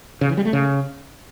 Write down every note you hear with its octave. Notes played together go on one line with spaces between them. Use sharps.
C#3
E3
G3
A3
C#3